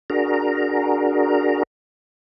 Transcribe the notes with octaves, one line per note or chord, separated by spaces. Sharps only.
D4 F#4 G#4 A#4 A#5